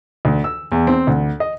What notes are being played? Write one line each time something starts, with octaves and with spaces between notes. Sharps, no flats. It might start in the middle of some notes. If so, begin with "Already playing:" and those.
D2
E6
E2
C4
D2
D#5